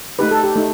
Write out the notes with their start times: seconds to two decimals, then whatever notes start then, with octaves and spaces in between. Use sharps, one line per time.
0.19 A3 D#4 G4 B4
0.31 A4
0.44 G4
0.56 A3 D#4